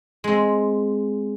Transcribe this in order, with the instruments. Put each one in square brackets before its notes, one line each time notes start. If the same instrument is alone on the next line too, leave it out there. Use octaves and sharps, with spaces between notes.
[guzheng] G#3 C4